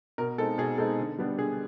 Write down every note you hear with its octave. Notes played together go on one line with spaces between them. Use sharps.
B2 A#4
G#3 C4 D#4 A4
B2 G#4
G#3 C4 D#4 A4
D3
G3 B3 D4
D3 G#4